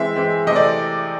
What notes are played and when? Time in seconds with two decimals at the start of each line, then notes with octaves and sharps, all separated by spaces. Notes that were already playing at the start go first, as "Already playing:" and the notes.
Already playing: E3 G#3 C4 E5
0.16 E3 G#3 C4
0.47 C3 E3 A3 C4 D#5
0.56 D5